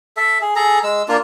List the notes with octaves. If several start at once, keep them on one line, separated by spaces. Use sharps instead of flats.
A4 E5
G#4
G#4 A4 A#5
G#3 E6
A#3 D4 F4